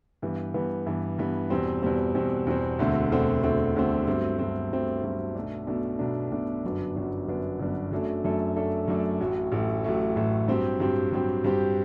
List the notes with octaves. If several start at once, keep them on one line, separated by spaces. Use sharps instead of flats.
G2 E3 B3
G2 E3 B3
G2 E3 B3
G2 E3 B3
E2 B2 G3 C4
E2 B2 G3 C4
E2 B2 G3 C4
E2 B2 G3 C4
E1 D2 D3 A3 C4
E1 D2 D3 A3 C4
E1 D2 D3 A3 C4
E1 D2 D3 A3 C4
G2 F#3 A3 C4
G2 F#3 A3 C4
G2 F#3 A3 C4
G2 F#3 A3 C4
B1 B2 A3 D4
B1 B2 A3 D4
B1 B2 A3 D4
B1 B2 A3 D4
G1 F#2 F#3 B3 D4
G1 F#2 F#3 B3 D4
G1 F#2 F#3 B3 D4
G1 F#2 F#3 B3 D4
F#2 F#3 A3 D4 A4
F#2 F#3 A3 D4 A4
F#2 F#3 A3 D4 A4
F#2 F#3 A3 D4 A4
A1 A2 F#3 A3
A1 A2 F#3 A3
A1 A2 F#3 A3
A1 A2 F#3 A3
G2 F#3 C4 G4
G2 F#3 C4 G4
G2 F#3 C4 G4
G2 F#3 C4 G4